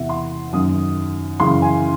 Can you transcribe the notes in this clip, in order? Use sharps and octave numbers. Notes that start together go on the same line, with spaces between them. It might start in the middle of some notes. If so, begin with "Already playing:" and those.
Already playing: E2 C3 E3 E5 F#5
C6
F#2 D#3 F#3 D#6
F#2 C#3 E3 C6
G#5